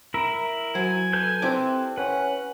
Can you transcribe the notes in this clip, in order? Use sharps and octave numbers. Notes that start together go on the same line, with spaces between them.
E4 A#4 E5
F#3 C5 G#5
A4 B4 G6
C4 E4 G4 D5
C#4 B4 F#5